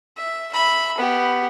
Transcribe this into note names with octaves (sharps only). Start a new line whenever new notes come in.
E5
E5 B5
B3 G4